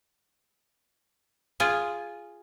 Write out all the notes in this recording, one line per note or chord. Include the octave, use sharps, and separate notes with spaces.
F4 G#4 F5